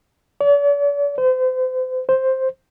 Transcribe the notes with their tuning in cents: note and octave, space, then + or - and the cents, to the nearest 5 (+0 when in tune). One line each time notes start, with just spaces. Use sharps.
D5 -45
C5 -35
C5 +5